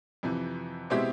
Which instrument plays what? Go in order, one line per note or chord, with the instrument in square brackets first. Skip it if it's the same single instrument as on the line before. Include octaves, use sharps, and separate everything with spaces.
[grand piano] F2 C3 E3
B2 G#3 C4 E4 G4